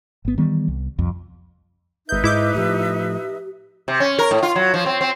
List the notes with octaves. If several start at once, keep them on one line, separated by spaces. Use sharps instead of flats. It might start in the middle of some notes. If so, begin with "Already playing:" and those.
G#1 B3
D#3 E3 G3 B3
C2
C2 F2
G#1 D#4 B4 E5 G6
G#2 E4 D#5 D6 G6
A2 F3 G4
C3
C#4
A#4
A2
F4
F#3
F3
C4
C4